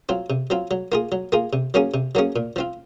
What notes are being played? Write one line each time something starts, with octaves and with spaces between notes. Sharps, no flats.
F#3 C4 F4
C3
F#3 C4 F4
F#3
A#3 F4 G#4
F#3
A#3 F4 G#4
C3
F#3 A#3 C#4 G#4
C3
F#3 A#3 C#4 G#4
A#2
F3 C4 F4